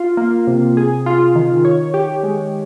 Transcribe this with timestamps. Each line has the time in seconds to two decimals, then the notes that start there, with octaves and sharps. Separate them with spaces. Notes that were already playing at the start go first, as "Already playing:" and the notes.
Already playing: F4
0.17 A#3
0.47 C3
0.77 G#4
1.06 F4
1.36 D#3
1.65 C#5
1.94 G4
2.23 G#3